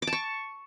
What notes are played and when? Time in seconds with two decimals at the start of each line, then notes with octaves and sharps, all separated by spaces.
0.02 D6
0.07 A5
0.13 C#6